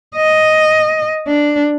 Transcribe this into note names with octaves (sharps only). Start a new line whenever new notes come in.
D#5
D4